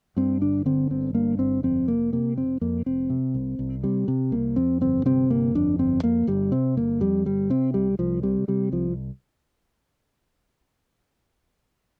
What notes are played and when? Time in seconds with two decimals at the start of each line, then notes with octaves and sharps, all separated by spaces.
0.17 G2 C4
0.41 G1 D4
0.66 D3 C4
0.91 G1 C4
1.14 G2 A#3
1.39 G1 C4
1.63 F2 C4
1.88 F1 A#3
2.12 C3 A#3
2.37 F1 C4
2.61 F2 A#3
2.86 F1 C4
3.10 C3
3.34 C2
3.59 C2
3.84 C3 G3
4.08 C3
4.32 C2 A#3
4.56 F2 C4
4.81 G1 C4
5.06 C3 C4
5.30 G1 A#3
5.55 F2 D4
5.79 G1 C4
6.04 F2 A#3
6.27 G1 G3
6.52 C3 C4
6.77 G1 A#3
7.01 F2 G3
7.25 G1 G3
7.50 C3 C4
7.74 C2 G3
7.99 C2 F3
8.23 C3 G3
8.48 C3 G3
8.72 C2 F3